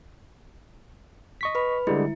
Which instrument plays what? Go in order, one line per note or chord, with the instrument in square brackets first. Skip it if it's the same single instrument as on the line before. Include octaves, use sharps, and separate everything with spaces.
[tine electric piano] D#5 C#6 B6
[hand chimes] B4 B5
[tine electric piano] D3 G3 G#3 [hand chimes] E4